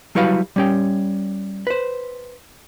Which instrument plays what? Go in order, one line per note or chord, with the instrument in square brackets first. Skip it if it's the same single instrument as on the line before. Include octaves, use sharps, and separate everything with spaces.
[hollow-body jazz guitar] F#3 G3 E4 F#4 B4 F5
G3 C#4 G5
B4 C5